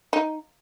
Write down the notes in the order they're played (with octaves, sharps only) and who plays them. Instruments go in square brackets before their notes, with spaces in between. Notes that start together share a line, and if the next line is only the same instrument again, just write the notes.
[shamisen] D#4